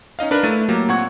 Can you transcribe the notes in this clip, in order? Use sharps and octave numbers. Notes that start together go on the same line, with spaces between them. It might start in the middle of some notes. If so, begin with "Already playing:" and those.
C#4 D#4 D#5 F5
D4 A#4 B4
A3 E4 A6 D#7
F#3 A#3 G4
A#2 C4 F#5 C#6 G#6